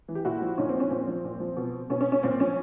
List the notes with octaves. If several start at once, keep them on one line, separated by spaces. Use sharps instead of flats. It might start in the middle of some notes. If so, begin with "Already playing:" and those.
E3
G4
A#2 E4 F#4
F3
A#2 C#4 D#4
C4
F3
C#4
A#2 C4
F3
A#2
F3
B2
B2 C#4
C#4
C#4
A#2 C4
F3 C#4